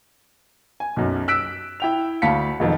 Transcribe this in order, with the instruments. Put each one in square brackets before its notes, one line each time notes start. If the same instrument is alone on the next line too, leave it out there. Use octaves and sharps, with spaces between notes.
[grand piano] G#5
B1 F#2
E6 F#6 B6 D7
E4 G5 F7
D2 F5 A5 B5 B6 C#7
E1 F2 D#3